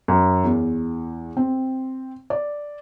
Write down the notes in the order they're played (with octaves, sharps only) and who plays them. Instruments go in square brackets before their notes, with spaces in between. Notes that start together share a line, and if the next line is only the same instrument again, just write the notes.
[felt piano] F#2
E2
C4
D5